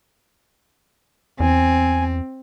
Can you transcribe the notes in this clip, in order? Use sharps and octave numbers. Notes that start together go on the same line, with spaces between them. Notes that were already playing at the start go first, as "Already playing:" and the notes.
E2 C4 G#5